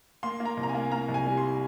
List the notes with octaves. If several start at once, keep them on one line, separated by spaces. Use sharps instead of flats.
A#3 C6
A#3
A#5
C2
A#5
G#5
A#3
A#3 A#5
C2
G#5
G3
C6